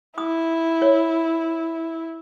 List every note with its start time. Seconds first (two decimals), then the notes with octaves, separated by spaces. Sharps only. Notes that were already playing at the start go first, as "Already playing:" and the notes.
0.18 E4 D#6
0.82 C#5